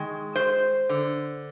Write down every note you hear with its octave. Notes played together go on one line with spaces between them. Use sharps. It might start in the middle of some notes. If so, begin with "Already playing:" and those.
Already playing: D#3 G#3
C5
D3